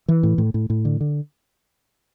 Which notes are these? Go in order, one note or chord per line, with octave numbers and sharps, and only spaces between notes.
E3
A2
A2
A2
A2
D3
D3